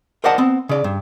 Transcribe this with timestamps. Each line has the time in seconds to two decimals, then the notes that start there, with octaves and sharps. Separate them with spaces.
0.24 A#4 C5 D5 D#5 F#5 A5
0.38 B3 C4
0.69 C#3 D5
0.84 G2